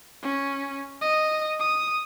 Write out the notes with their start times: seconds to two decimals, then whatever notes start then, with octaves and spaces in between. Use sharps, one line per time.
0.23 C#4
1.02 D#5
1.60 D#6